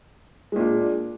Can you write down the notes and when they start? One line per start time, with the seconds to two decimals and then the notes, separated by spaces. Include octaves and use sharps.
0.52 G#3
0.56 A#2
0.60 D4